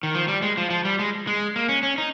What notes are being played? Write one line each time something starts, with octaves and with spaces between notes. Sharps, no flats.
D#3
F3
G3
G#3
F3
F3
G3
G#3
G#3
A#3
C#4
C#4
D#4